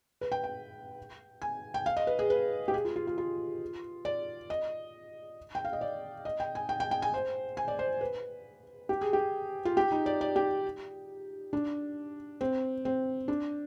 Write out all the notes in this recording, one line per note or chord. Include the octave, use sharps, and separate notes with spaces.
B4
G5
G5
G#5
G5
F5
D#5
B4
G#4
B4
G4
G#4
F4
F4
F4
F4
D5
D#5
G5
F5
D#5
D5
D#5
G5
G#5
G5
G5
G5
G#5
C5
G#5
D5
C5
B4
G4
G#4
G4
F4
G4
D#4
D5
D5
G4
D4
C4
C4
D4